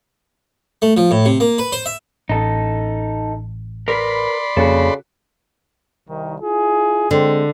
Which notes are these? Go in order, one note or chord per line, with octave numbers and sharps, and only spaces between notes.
A3
F3
A2
C3
A#3
B4
C5
E5
A1 D#4 A4
A#4 B4 D5 B5 C6
F2 C#3 A#3 F#4 A4
C2 D#3
E4 F4 G#4
D3 G#3 C4